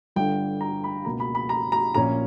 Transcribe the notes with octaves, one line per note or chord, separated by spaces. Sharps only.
G1 G2 D3 G5
A#5
B5
C#2 B2 A#3 A#5
B5
B5
A#5
A#5
A#1 A#2 A#3 C#4 A#5